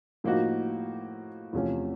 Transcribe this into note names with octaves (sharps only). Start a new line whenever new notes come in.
A2 F3 A#3 D#4 F#4
E2 C3 F3 A3 C#4